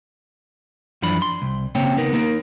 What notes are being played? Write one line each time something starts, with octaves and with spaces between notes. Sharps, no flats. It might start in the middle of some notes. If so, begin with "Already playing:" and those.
F#2 E3 F3 D4 B5
C6
C2
C#3 A#3 C4 C#4 C#5 G5
B3 D#4 A#4
A#3 D#4 A#4